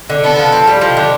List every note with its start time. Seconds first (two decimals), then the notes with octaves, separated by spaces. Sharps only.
0.10 D3
0.24 B3 A4
0.39 F3
0.52 C4
0.67 G3
0.81 F3 G4
0.97 D3